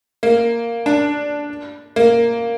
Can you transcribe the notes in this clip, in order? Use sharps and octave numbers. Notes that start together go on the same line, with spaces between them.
A#3
D4
A#3